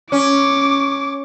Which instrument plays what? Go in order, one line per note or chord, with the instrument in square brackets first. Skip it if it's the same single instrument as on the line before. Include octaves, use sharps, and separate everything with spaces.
[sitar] C#4 [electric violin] D6